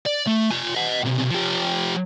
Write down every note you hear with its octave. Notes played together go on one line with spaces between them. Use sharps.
D5
A3
F4 G#5
D#5 F#5
B1 C3
F3 G4